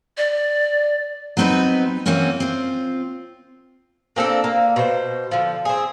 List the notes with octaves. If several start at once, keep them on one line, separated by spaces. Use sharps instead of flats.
D5
F#3 B3 C4 D#4 B4
E3 F#3 A#3 C4 C#4
C4 F4
A#3 C4 D4 A4
A#3
B2 C5
D3 F3
C4 G#4